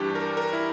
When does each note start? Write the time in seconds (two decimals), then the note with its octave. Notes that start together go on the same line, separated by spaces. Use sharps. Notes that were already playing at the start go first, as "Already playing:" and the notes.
Already playing: G2 E3 G3 D4 G4
0.15 A#4
0.37 A#4
0.53 E4